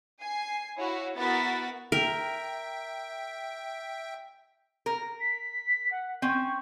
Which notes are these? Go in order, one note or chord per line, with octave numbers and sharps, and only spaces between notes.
G#5 C7
E4 F#4 C#5 F5
B3 E4 F#4 A#4 A6 B6
A#4 E5 G5
A#4
B6
F#5
C4 C#4 C#6